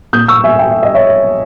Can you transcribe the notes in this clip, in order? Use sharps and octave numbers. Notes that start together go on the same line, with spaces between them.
A#2 D#6 G6
C#6 E6
E5 G#5
G5
E5
D#5
C#5 E5